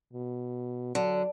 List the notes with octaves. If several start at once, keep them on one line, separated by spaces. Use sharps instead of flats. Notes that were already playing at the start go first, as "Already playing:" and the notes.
B2
D3 F#3